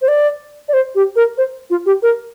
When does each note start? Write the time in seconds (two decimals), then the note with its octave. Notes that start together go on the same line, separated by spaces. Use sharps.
0.02 C5
0.08 D5
0.68 D5
0.73 C5
0.95 G4
1.16 A#4
1.38 C5
1.70 F4
1.86 G4
2.02 A#4